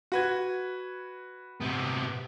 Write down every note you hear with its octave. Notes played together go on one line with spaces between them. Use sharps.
F#4 B4 G#6
C3 B3